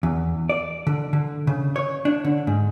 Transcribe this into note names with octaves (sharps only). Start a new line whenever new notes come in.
E2
D5
D3
D3
C#3
C#5
D4
D3
G#2